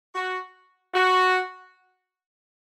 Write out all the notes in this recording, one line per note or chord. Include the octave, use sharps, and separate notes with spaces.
F#4
F#4